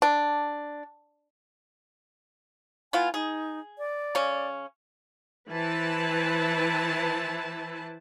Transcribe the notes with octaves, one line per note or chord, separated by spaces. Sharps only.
D4
B3 E4 F4 G#5
D#4 G#4
D5
C#3 C#4
E3 E4 B4 C5 A5